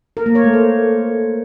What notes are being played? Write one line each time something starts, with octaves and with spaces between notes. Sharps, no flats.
A#4
A#3
C#5
A3
C5